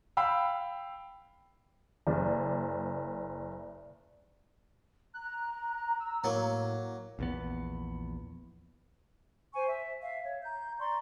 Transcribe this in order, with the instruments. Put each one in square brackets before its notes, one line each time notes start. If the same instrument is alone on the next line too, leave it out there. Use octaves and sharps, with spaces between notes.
[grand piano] F5 G5 B5 E6
[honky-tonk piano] F#1 [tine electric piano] D5
[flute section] A#5 [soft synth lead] F#6
[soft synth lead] E6
[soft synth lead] A2 [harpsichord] F#3 A#3
[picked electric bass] A#1 E2 B3
[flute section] C5 G#5 C#6
E5
E5 F5
C#5
A#5 G6
D5 A#5 C6 C#6